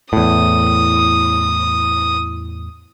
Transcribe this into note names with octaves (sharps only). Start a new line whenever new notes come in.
E2 A2 D#6